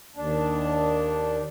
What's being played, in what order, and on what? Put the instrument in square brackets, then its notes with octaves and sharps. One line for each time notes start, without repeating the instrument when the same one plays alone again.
[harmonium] D#2 D4